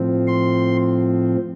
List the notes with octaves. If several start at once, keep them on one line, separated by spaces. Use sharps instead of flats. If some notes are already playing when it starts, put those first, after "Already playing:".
Already playing: A2 F3 C4
C6